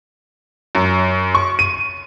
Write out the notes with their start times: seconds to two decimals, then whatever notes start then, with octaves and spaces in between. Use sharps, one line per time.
0.75 F#2
1.35 C#6
1.59 D#7